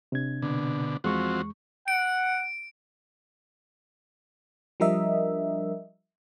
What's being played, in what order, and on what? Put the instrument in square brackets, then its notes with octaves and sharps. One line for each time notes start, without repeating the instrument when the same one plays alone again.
[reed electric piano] C3 D4 G#6
[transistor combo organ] B2 D3
[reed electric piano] E2 G#3 C#6 [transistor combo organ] F3 C4 F#4
[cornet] F#5 [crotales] D7
[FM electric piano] F3 G3 D4 A#4 D#5 E5